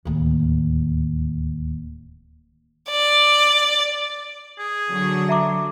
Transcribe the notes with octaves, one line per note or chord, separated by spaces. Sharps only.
D1 D#2
D5
G#4
D3 F#3
E5 A#5 D6